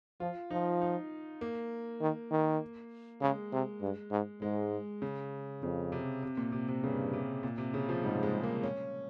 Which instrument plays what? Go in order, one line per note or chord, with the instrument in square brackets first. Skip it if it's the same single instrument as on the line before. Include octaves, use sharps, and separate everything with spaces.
[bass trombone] F3 [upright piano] F4
[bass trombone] F3 [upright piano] D#4
[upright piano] D#4
A#3
[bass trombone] D#3
D#3
[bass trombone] C#3 [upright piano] G#3
[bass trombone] C3
G2
G#2
[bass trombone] G#2 [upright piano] G#3
[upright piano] C#3
[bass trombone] F2 [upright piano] C#3
[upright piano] C3
C3
A#2
C3
C3
[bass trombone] G2 [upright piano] C#3
[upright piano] C3
A#2
C3
C#3
F3
[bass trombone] G#2 [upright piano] G3
[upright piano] G#3
A#3
C#4